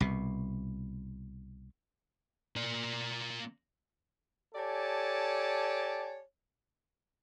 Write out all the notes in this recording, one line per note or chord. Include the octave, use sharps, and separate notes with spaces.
C2 B2
A#3 D5
G4 A4 C#5 D5 G#5 A5